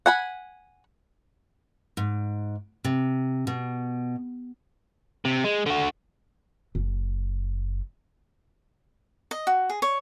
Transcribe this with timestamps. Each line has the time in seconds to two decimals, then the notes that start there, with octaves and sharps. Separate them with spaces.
0.06 F#5 G#5 B5
1.97 G#2
2.84 C3
3.47 B2
5.25 C3
5.44 G#3
5.66 D3 F#4
6.75 F#1
9.31 D#5
9.47 F#4
9.70 G#4
9.82 C#5